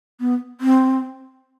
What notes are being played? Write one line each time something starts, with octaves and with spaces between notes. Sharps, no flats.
B3
C4